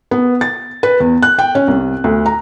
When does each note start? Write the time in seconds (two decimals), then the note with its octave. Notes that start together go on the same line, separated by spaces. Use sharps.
0.11 B3
0.41 A6
0.83 B4
1.00 E2
1.23 F#6
1.39 G5
1.55 C#4
1.68 C2
2.04 D2
2.26 A#5